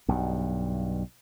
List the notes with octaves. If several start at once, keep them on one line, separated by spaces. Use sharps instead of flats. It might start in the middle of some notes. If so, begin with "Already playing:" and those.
B1 G2